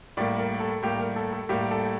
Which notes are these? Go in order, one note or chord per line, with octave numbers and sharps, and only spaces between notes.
A2 G3 A#3 D5
A#4
A4
A2 G3 A#3 G4
A#4
A4
A4
A2 G3 A#3 G4
A4